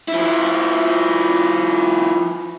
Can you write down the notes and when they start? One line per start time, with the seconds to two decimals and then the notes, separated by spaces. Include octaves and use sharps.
0.08 F3 E4